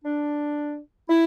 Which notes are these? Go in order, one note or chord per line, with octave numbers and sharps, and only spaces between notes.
D4
E4